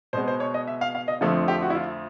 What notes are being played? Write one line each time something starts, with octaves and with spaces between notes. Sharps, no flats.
B2 G#3 B3 C5
C5
C#5
D#5
E5
F5
F5
D#5
F2 D3 F3 A3 C4 A4
G4
F#4
E4
F4